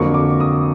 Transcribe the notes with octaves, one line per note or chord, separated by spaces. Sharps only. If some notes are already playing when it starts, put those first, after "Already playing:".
Already playing: F2 D3 F#3 A#3 C#6
D6
D#6